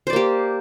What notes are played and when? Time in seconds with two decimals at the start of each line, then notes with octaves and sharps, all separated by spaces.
0.07 C5
0.10 D5
0.13 A#3
0.16 G4